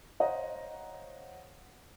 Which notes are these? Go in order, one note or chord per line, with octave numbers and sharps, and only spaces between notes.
C5 C#5 D#5 F5 F#5 A#5